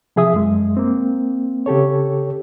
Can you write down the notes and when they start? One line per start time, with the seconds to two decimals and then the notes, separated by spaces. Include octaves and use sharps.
0.16 C3 F3 G#4 E5 D#6
0.34 F#2 G#3
0.77 A#3 C4
1.66 C#3 G4 A4 C#5